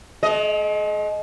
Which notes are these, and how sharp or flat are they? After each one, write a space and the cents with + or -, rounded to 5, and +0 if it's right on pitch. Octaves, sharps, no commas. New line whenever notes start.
G#3 +45 D#5 +0